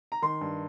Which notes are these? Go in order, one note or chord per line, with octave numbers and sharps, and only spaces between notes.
A#5
D#3 C6
G2